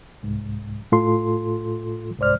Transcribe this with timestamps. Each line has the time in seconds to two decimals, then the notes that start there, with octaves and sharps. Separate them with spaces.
0.23 C2 G#2
0.92 A2 F4 A4 C6
2.19 C2 G#2 C5 D5 F6